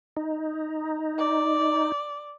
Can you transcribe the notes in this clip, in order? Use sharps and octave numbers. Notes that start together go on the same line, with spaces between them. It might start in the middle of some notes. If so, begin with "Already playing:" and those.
D#4
D5